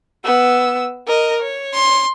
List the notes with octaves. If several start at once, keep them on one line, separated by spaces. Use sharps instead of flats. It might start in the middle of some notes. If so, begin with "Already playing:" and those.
B3 E6
A#4 D#5
C#5
C6